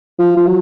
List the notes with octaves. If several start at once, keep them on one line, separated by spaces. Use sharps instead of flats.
F3
F3
F#3